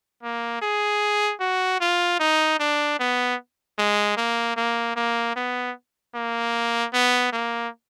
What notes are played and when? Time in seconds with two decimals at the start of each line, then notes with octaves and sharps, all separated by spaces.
0.23 A#3
0.62 G#4
1.40 F#4
1.81 F4
2.19 D#4
2.59 D4
3.00 B3
3.78 G#3
4.17 A#3
4.57 A#3
4.96 A#3
5.36 B3
6.15 A#3
6.93 B3
7.33 A#3